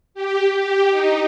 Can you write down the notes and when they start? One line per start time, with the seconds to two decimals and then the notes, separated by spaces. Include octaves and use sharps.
0.14 G4
0.57 G4
0.90 D#4